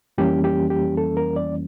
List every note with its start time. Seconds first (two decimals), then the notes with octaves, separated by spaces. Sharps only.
0.18 F2 E3 G3 A#3 C#4 G4
0.44 G4
0.70 G4
0.97 A4
1.17 A#4
1.36 D5